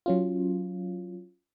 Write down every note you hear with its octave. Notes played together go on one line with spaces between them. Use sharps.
F#3 C#4 F4